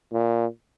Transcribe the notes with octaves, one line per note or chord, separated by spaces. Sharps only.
A#2